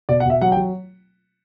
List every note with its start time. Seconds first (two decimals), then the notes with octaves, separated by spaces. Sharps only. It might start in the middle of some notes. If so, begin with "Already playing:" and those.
0.09 B2 D5
0.20 F#5
0.26 B2 E5
0.41 F#3 F#5
0.52 G5
0.57 F#3